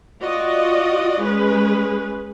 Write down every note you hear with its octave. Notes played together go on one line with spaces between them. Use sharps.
F4 F#4 D5 D#5
G#3 C#4 G#4 B4